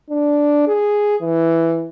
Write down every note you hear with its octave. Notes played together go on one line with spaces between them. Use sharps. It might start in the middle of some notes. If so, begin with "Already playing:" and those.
D4
G#4
E3